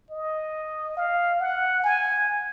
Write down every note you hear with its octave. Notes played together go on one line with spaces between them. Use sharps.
D#5
F5
F#5
G#5